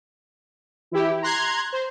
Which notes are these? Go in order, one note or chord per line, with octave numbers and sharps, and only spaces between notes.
E3 E4 G4
A#5 C6 F#6 G#6
C5